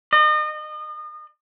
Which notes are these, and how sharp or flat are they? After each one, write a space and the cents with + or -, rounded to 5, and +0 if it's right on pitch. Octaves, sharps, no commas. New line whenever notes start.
D#5 -35